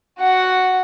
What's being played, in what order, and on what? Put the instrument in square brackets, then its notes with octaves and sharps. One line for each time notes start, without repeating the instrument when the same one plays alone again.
[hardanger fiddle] F#4 F#5